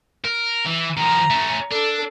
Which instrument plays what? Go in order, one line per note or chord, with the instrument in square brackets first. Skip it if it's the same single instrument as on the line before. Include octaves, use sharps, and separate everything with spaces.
[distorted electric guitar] A#4
E3
[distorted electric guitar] D#3 F3 [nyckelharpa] A#5
[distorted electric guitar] A3 C#4
[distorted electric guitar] D4 [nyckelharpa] A4